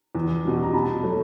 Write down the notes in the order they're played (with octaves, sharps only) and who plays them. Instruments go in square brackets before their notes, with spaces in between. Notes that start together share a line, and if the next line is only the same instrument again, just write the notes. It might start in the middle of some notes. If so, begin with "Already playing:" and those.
[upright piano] E2
B2 G3
A#5
B2 A5 B5
F#3 A3